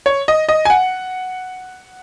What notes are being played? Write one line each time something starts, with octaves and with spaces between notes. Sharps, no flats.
C#5
D#5
D#5
G#5
F#5